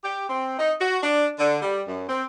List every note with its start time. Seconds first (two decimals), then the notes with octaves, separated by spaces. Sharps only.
0.04 G4
0.30 C4
0.59 D#4
0.81 F#4
1.03 D4
1.39 D3
1.62 G3
1.88 F#2
2.09 C4